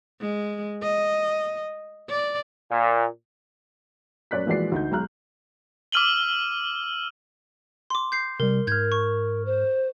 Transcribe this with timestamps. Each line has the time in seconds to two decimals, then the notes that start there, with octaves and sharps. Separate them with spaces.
0.21 G#3
0.83 D#5
2.09 D5
2.71 A#2
4.31 F#2 C#5 D5 F#6 B6
4.46 A#1 E3 G#3 F#4 D5 C7
4.72 D2 D#4 G6
4.91 B1 G#3 A#5 F6 F#6
5.92 D6 E6 F6 D#7 F#7 G7
7.90 C6 D6
8.12 G6 C7
8.40 C3 G3 A#4
8.67 G#2 A#4 F6 G6 G#6
8.92 C#6
9.46 C5